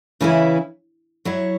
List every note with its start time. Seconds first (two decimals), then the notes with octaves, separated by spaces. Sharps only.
0.21 C#3 E3 C#4 E4 B4
1.25 F#3 E4 C#5